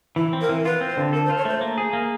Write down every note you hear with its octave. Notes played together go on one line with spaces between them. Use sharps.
E3 E4
C4
A#4
E3
F4 B4
C4
C5
D3
A4 A#4
C5
F4
C#5
A3 C5
A#3
G#4
A#3